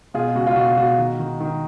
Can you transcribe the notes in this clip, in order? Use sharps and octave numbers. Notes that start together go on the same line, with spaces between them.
B2 F4 G#4
C#2 F#4
F4
B2 F#4
B2 F#4
D#3
D#3
D#3